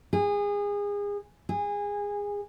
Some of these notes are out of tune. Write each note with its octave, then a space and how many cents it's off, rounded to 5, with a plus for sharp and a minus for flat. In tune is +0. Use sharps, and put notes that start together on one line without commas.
G#4 -30
G#4 -25